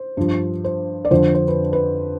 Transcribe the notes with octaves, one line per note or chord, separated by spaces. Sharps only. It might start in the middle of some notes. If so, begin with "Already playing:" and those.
Already playing: C5
G2 F3
C5
D5
F2 D3 F3 C5
C5
B4
B4